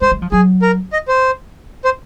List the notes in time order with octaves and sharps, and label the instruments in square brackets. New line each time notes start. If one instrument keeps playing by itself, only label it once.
[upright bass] G#3 [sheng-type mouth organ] C5
[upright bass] G#3
F3
[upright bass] F#3 [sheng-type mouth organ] G#4
[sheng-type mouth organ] A#4
D#5
C5
C5